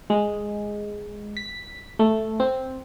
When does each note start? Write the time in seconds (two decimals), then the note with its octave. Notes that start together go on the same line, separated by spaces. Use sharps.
0.10 G#3
1.37 B6
1.99 A3
2.40 C4